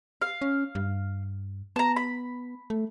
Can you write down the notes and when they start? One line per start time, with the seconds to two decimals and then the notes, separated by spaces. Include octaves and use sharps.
0.22 F5
0.42 C#4
0.75 G2
1.76 B3 A5 A#5
1.96 B5
2.70 A3